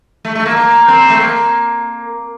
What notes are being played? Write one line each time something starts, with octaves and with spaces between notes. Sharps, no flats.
A3
A3
A#3
A#3
C4
A3
A#3